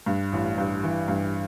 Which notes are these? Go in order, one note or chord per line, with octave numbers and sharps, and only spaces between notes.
G2
A1
G2
E3
G2